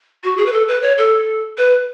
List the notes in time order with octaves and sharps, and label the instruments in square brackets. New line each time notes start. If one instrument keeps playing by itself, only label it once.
[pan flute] F#4
G#4
B4
A4
B4
C#5
A4
B4